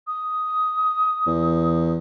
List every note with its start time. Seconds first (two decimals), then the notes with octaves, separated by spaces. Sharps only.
0.07 D#6
1.27 E2